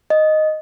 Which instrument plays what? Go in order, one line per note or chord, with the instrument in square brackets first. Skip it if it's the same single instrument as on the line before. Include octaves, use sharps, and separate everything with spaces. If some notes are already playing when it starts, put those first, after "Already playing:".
[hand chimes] D#5